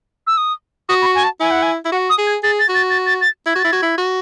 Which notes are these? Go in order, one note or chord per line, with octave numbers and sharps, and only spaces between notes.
E6
D#6
F#4 D#6
B5
C#6
G#5
A5
E4 G#5
F#5
G#5
E4
F#4 F#5
D#6
G#4
G#6
G#4 A6
A6
F#4
A6
A6
A6
A6
E4 G#6
F#4
A6
E4
F#4 G#6
E4
F#4